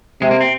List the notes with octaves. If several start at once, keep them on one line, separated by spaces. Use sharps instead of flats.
C3 G#3
A#3
C4